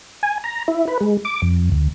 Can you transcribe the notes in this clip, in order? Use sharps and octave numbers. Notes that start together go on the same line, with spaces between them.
G#5
A#5
E4
B4
G#3
D6
F2
D2